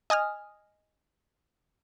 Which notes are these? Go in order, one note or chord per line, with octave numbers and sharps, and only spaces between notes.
D#5 G#5 D#6 F6